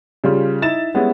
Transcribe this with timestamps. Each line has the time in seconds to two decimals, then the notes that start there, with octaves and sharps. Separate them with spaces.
0.24 C#3 G3 F4
0.62 D#4 E4 A6 E7
0.94 G3 G#3 B3 C#4 E4